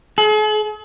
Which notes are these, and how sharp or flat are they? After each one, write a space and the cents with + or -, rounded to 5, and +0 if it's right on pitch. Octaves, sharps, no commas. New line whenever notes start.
G#4 +45